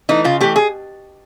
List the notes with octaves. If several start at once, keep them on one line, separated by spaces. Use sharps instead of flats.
E3 A3 D#4
C#3 F4
E3 A3 G4
G#4